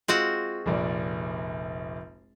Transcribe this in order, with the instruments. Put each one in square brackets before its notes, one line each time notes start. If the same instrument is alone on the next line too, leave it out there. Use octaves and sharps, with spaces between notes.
[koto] G#3 C4 F#4 [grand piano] F4
[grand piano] F1 A#1 D5